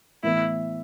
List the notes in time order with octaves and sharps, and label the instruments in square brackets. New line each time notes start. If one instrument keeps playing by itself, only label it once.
[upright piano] A2 E3 B3 [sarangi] E4